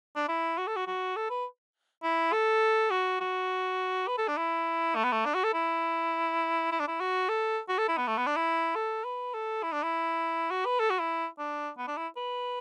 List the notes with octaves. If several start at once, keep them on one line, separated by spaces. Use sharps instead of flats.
D4
E4
F#4
A4
F#4
F#4
A4
B4
E4
A4
F#4
F#4
B4
A4
D4
E4
A3
B3
A3
D4
F#4
A4
E4
E4
D4
E4
F#4
A4
F#4
A4
E4
B3
A3
B3
D4
E4
A4
B4
A4
E4
D4
E4
F#4
B4
A4
F#4
E4
D4
B3
D4
E4
B4